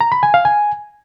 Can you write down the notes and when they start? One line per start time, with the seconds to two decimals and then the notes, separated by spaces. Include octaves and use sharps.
0.01 A#5
0.12 B5
0.23 G#5
0.34 F5
0.45 G#5